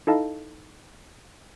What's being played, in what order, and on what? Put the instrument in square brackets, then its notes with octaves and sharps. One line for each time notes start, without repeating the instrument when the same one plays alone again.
[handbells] D#4 E4 A4 D#5 F5 A5